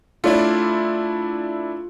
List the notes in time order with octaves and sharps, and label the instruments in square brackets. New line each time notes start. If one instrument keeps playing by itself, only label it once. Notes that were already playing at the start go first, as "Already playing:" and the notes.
[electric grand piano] A3 D4 E4 [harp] F4 D5